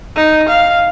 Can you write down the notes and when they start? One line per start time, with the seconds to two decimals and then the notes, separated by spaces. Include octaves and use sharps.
0.16 D#4
0.49 F5